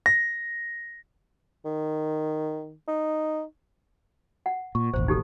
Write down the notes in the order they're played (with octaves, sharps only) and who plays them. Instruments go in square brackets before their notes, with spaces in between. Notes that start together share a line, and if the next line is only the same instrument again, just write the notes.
[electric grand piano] A#6
[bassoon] D#3
D#4
[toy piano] F#5
[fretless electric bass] A#2 [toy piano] C#6
[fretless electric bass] E1 A1 D#2 [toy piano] C5
[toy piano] D#4 G4 A4